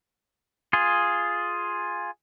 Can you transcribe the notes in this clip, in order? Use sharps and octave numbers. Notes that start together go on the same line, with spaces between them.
F4 G#4